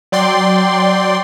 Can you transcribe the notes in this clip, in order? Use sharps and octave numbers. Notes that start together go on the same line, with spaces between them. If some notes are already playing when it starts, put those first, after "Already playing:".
F#3 D5 G5 C6